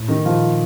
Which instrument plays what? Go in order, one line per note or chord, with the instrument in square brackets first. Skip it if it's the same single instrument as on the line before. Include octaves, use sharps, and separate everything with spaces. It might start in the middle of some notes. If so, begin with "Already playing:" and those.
Already playing: [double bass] A2
[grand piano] D#3 D#4
[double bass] A#2 [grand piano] F3 F4